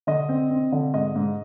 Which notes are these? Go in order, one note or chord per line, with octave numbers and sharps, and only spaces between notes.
D3 D#5
C4
C4
D3
G#2 D#5
G#2